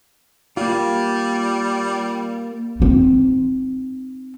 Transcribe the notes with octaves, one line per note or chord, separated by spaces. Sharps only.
G3 A#3 F4
C4 D#4